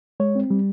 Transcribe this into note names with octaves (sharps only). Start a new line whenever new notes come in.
G#3 C#5
C4
G3